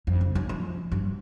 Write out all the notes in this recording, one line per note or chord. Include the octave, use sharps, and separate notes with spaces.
F2
F#1
C#4
F3
G2